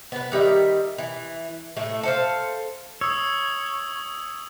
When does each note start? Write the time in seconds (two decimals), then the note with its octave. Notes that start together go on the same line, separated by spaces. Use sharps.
0.12 B3 B4
0.32 D#3 G3 E5
0.98 E3
1.77 A2 A3
2.03 A4 C5 F5
3.01 C#5 D#6 E6